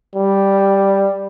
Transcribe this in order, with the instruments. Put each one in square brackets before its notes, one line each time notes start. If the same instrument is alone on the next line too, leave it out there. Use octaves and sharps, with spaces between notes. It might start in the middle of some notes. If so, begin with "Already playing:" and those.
[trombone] G3